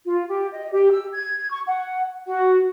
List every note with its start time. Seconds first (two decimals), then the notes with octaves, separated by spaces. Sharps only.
0.06 F4
0.27 G4
0.52 D#5
0.72 G4
0.91 E6
1.14 G#6
1.50 C#6
1.66 F#5
2.26 F#4